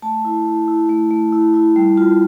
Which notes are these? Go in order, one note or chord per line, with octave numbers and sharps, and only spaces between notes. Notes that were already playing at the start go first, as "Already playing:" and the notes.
A3 A5
E4
E4
E4
A3
A3
E4
E4
G3
F4